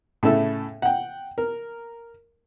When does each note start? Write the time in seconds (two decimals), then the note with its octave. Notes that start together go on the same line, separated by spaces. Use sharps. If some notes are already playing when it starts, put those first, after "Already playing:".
0.23 A2 C#3 E4 A4 E5
0.82 F#5 G5
1.38 A#4